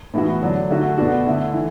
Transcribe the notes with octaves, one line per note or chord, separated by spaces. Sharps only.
A2 E3 B3 F#4
D3 F#3 D4
D3 A3 F#4
B2 B3 D4 F#4
D3 A3 E4
E3